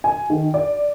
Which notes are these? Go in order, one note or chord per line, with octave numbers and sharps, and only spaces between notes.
G#5
D#3
D5